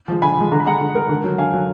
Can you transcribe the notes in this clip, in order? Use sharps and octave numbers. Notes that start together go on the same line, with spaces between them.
F3 G#3
D3 G#5 B5
F3 G#3
D3 A#5
B5
G#3 F#5 A#5
D3
G#3 A#4
D3
F#3
D3 F5 G#5
F#3